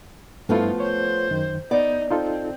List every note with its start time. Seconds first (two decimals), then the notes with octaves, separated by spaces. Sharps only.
0.49 G2 F3 A3 B3 E4 F4
0.80 C5 C#5
1.31 F#2 D#3
1.71 B3 D#4 D5
2.11 C4 D#4 F4 A4